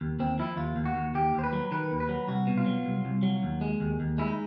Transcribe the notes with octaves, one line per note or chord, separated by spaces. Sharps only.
D#2
D#2 C4
F3 E4
D#2 F4
D#2
F#4
D#2
D#2 G4
D#2 C5
B4
F#3
D#3 B4
D#2
B4
F#3
C2 F#4
B2
F4
F#3
C2
C2
F#3
D#2
G#3
D#2
D#2
G#3 E4
D#4